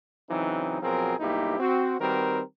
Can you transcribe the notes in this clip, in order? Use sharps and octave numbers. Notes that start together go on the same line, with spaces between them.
C#3 E3 F#3 C4 D#4
B2 F3 F#3 C4 G#4 A#4
B1 G2 A#3 D#4 E4 G4
C4 F#4
D#3 G3 C4 F#4 A#4 B4